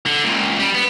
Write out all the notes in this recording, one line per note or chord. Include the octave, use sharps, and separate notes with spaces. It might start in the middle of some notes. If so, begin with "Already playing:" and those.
D3
C#2 A#2
G3
B3